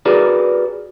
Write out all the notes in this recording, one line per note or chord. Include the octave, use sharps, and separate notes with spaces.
F#4 G#4 A#4 B4 D5